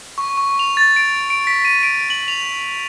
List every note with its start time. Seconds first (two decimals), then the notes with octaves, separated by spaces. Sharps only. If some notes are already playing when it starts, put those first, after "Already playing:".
0.18 C#6
0.37 C#6
0.59 F7
0.77 A6
0.96 D7
1.30 D7
1.47 B6
1.65 D#7
1.83 D7
2.10 F#7
2.28 F7